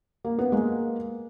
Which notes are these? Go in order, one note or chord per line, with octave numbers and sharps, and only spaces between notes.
A#3
B3
G#3 A#3